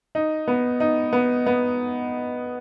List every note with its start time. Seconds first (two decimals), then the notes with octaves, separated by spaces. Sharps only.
0.15 D#4
0.48 B3
0.80 D#4
1.13 B3
1.46 B3